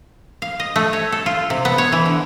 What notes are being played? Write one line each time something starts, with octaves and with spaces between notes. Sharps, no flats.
F5
D#5
A3
C#5
A4
F4
C3
B3
C#5
E3
D3